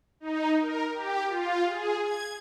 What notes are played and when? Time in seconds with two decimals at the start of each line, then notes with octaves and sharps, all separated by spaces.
0.20 D#4
0.61 A#4
0.93 G4
1.27 F4
1.68 G#4
2.03 G#6